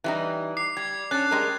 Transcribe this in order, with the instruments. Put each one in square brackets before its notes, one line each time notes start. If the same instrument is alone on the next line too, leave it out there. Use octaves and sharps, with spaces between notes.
[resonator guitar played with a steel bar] E3 G3 D#4
[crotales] D6 C7
[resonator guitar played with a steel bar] G3 [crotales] G#6
[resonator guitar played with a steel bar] C#4 D4 [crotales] F#6 A6
[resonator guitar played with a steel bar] G3 G#3 A#4